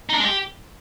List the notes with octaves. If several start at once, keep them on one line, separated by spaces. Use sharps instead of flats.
D#4
D4
G#3
G4